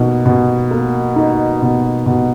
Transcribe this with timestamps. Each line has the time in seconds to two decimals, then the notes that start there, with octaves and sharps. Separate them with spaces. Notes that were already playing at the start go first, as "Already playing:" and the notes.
Already playing: B2 A#3 D#4
0.26 B2
0.71 A#3
1.16 D#4
1.62 B2
2.06 B2